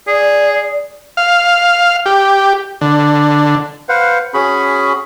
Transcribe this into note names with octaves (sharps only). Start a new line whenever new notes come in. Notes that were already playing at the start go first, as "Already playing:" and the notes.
G#4 D5
F5
G4
D3
B4 C5 F5 F#5
C#4 F#4 G#4 B5